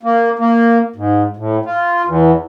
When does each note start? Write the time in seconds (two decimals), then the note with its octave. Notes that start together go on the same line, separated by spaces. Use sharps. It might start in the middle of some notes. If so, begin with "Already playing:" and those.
0.03 A#3
0.39 A#3
0.96 G#2
1.37 A2
1.66 F4
2.05 E2